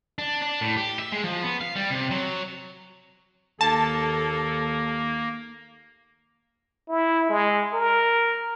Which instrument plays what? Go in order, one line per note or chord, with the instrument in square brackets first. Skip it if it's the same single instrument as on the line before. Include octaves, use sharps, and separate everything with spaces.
[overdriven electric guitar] D4
D4
A2
G4
E5
G#3
F3
B3
F5
G3
C3
F#3
[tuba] D#2 [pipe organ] A#3 [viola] A4 [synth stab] A5
[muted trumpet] E4
G#3
A#4